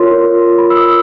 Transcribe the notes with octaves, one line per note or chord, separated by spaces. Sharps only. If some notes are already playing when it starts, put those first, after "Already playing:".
Already playing: F4 A#4 C#5 C6
B5
E6
D#6